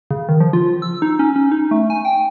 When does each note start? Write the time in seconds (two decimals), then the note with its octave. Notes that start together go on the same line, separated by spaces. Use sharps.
0.11 C#3
0.29 D#3
0.40 F3
0.53 F4
0.82 E6
1.02 D#4
1.19 C#4
1.36 C#4
1.52 D#4
1.71 A3
1.90 G#5
2.05 G5